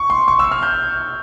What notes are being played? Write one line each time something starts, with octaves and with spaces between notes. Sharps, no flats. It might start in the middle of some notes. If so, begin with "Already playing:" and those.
Already playing: C#6
C6
C#6
E6
F6
G6